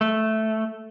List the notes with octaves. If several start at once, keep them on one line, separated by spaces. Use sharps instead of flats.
A3